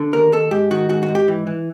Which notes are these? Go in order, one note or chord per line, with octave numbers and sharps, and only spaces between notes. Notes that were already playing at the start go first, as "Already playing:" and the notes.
Already playing: D3
D#2 A#4
D#2 A4
G#2 G4
D#3 F#4
G#2 F#4
F#4
G#2
G4
E3
E3